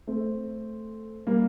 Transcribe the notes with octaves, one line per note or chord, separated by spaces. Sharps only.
A3 C4
G3 A#3